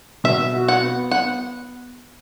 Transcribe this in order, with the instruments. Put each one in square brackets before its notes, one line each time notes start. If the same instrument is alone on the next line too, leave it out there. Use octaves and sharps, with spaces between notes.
[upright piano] B2 [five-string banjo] E5
[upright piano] F#4
[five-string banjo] F#5
[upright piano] B3
[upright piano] B3 [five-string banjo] F#5